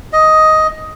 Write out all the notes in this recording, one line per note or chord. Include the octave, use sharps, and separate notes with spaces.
D#5